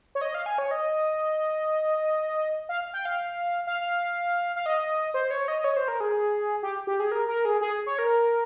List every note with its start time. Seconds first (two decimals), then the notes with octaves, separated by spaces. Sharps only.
0.15 C#5
0.21 D#5
0.35 F5
0.46 G#5
0.58 C#5
0.71 D#5
2.69 F5
2.93 G5
3.05 F5
3.67 F5
4.56 F5
4.66 D#5
5.14 C5
5.31 C#5
5.48 D#5
5.64 C#5
5.77 C5
5.88 A#4
6.00 G#4
6.63 G4
6.87 G4
7.00 G#4
7.12 A#4
7.28 A#4
7.45 G#4
7.61 G#4
7.86 C#5
7.99 A#4